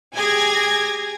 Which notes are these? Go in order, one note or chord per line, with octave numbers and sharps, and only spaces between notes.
G4 G#4 G#5 G#6 A#6